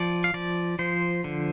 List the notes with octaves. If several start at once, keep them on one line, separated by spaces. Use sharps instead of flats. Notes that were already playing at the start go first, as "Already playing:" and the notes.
Already playing: F3 D5
F5
F3 D5
F3 C5
D3